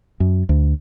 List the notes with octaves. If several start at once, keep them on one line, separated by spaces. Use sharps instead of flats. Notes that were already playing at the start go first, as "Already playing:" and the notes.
F#2
D2